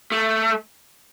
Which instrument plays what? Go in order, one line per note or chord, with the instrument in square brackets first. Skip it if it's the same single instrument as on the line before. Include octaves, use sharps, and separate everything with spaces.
[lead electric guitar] A3